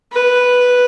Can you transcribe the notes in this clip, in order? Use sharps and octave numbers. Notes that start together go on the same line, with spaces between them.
B4